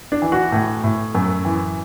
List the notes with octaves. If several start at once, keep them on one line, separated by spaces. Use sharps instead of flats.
D4
E3
F#4
A2
A2
F#2
E3